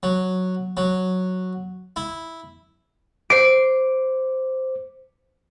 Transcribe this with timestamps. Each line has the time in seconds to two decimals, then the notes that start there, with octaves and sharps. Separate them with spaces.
0.03 F#3
0.77 F#3
1.96 E4
3.30 C5 D6 C7 D7